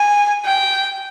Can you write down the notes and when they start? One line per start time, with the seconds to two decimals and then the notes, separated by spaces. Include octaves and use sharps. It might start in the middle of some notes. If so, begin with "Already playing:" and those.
Already playing: G#5
0.45 G5